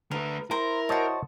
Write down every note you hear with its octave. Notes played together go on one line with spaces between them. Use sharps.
D3 A3 A#4 B4
E4 A#4 C5 A#5
F#4 C5 C#5 D#5 A5